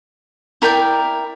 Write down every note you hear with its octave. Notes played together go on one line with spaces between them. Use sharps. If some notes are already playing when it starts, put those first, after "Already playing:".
E4 A#4 D5 G5